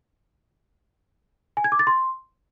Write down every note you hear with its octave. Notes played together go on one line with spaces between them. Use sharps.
G#5
G#6
D6
A6
C6